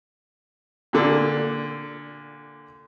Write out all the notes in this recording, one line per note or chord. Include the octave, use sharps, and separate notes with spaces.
A#2 D3